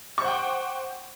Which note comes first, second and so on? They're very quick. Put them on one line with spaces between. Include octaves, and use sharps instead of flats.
C#6 C5 F#5 G5 D6